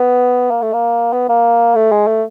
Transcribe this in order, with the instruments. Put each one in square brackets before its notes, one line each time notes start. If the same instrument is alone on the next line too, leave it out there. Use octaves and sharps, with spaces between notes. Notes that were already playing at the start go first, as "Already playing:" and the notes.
Already playing: [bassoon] B3
A#3
A3
A#3
B3
A#3
A3
G#3
A3